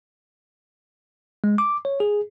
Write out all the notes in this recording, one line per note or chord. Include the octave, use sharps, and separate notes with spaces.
G#3
D6
C#5
G#4